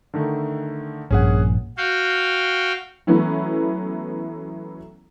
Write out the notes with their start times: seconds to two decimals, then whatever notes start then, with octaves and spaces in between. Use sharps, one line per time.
0.14 D3 D#3 A3
1.11 A#1 G2 A#2 C#4 G#4 F#5
1.77 F#4 F5 G5
3.07 E3 F#3 A3 B3 C#4 E4